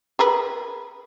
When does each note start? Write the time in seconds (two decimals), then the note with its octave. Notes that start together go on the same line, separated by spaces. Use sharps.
0.19 G#4 A#4 B4